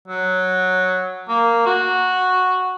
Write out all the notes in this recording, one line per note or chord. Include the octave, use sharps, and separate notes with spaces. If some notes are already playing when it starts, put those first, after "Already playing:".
F#3
A#3
F#4